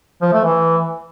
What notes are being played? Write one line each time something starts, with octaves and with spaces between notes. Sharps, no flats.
F3
A3
E3